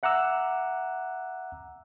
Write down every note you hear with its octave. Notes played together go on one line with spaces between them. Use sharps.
E5 F#5 A#5 D6 E6 F#6